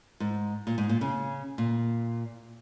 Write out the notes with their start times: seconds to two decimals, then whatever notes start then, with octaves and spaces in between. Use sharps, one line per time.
0.20 G#2
0.67 A#2
0.78 G#2
0.89 A#2
1.01 C#3
1.58 A#2